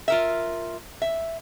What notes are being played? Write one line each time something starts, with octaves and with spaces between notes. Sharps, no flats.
F4 A#4 E5
E5